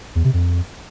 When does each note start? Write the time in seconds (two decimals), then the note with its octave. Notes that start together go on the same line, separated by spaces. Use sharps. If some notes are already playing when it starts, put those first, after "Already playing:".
0.15 E2
0.24 C3
0.34 F2